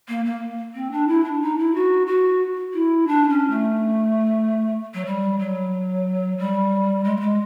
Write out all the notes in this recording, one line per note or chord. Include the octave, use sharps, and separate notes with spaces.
A#3
A#3
C4
D4
E4
D4
D#4
E4
F#4
F#4
E4
D4
C#4
A3
F#3
G3
F#3
G3
G#3
A3
G#3